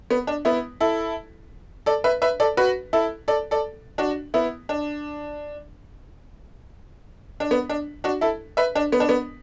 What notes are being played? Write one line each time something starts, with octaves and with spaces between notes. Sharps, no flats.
B3
D4
B3 E4
E4 A4
A4 D5
B4 E5
B4 E5
A4 D5
F#4 B4
E4 A4
A4 D5
A4 D5
D4 F#4
B3 E4
D4
D4
B3
D4
D4 F#4
E4 A4
B4 E5
D4
B3
D4
B3